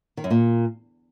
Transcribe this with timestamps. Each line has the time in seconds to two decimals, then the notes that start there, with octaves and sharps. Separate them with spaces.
0.17 D#3
0.24 F#2
0.31 A#2